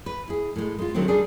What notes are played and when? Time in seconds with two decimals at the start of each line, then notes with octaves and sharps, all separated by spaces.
0.06 B4
0.28 E4 G#4
0.56 A2 G#3
0.79 G#3 F4
0.94 D3 D#3 F#3 G#3 A3 C4
1.08 G3 G#3 D4 G#4